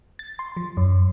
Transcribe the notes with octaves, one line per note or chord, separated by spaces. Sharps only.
A6
C6
F3
F#2